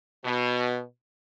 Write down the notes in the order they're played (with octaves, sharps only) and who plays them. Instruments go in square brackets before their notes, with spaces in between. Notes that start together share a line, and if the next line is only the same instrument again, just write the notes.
[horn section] B2